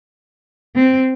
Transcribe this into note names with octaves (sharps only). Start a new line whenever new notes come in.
C4